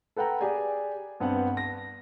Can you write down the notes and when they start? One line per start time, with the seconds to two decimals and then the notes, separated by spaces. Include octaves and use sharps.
0.16 A4 B4 F#5 G5 A#5
0.41 G4 G#4 D5 G#5
1.20 G2 B3 C4 F#5
1.57 A#6